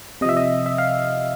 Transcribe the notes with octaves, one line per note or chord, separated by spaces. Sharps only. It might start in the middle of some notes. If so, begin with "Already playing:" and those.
C3 F3 D#5 E5
D#5
E5
F5